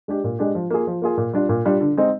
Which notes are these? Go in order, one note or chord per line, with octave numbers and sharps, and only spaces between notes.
G#3 D4 G4
A#2
G#3 D4 G4
F3
A#3 F4 G#4
F3
A#3 F4 G#4
A#2
G3 D4 F4
A#2
G3 D4 F4
D3
G#3 C4 D#4